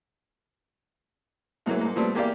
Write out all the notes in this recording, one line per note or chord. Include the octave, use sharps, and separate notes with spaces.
E2 G#2 E3 F#3 A#3
G#2 A#3
A#2 F3 G3 A3 B3 C4
E2 A#3 G4 D5 F5